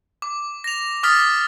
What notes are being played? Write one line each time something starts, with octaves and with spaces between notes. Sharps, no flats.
D6
A#6 F7
D6 D#6 F6 A6 B6